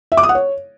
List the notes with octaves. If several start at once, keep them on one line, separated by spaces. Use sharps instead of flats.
E5
D6
D#6
F#5
C#5